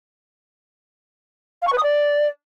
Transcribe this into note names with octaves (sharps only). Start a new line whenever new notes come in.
F5
C#6
B4
D#6
D5